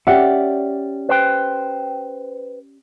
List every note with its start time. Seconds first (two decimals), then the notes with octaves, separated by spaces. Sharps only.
0.07 C#4 G4 D5 E5 F#5
1.09 B4 C5 G5